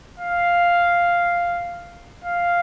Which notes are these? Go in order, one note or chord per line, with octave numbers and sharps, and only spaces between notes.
F5
F5